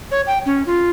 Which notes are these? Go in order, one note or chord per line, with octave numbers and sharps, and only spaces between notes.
C#5
G5
C#4
F4